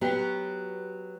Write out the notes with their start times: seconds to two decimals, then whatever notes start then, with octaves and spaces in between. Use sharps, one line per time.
0.01 F#3 B3 F#4 G4